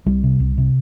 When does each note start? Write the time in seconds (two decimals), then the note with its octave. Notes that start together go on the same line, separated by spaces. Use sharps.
0.06 C2 G3
0.23 C3
0.40 C2
0.58 C3